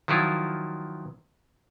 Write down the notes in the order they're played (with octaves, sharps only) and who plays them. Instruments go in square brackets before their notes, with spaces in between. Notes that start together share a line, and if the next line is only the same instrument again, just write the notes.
[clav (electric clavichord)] D#3 F3 F#3 E4 F4